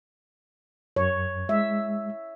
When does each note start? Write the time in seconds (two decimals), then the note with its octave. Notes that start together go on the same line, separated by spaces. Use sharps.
0.96 F#2 C#5
1.49 G#3 E5